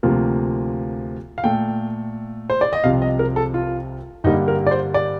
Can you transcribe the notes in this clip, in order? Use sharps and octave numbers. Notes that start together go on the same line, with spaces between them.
D2 C3 F3 A#3
F5
A#2 A3 G5
C5
D5
D#5
C2 C3 F3 F5
D#5
A#4
A4
F4
G2 D3 G3 A#3 D#4
A#4
D5
C5
D5